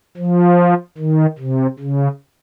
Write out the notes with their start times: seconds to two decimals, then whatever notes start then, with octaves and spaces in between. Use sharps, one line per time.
0.17 F3
0.98 D#3
1.39 C3
1.79 C#3